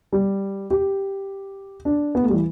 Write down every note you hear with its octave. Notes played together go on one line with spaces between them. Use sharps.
G3
G4
D4
B3
A3
G3
E3